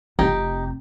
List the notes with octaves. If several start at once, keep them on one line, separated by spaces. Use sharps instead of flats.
F1 C3 D#4 G4